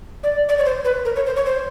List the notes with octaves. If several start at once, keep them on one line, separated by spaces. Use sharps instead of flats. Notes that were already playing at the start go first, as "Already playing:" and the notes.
D5
D5
C#5
C5
B4
A#4
C#5
C5
C#5
C5